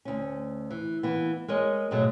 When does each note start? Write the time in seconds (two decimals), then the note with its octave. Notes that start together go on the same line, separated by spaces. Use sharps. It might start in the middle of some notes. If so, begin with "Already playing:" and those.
0.05 D2 C#4
0.70 E3
1.03 E3 A#3 B3
1.48 G#3 A#4 C#5 D#5
1.91 G#2 B2 D3 F#3 G#3 A3